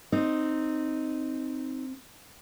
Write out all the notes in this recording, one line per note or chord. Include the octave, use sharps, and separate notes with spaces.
C4 D#4